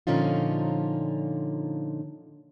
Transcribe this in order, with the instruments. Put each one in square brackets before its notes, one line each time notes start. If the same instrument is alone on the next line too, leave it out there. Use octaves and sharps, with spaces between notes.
[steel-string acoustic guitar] A#2 D3 F3 C#4 D#4 F4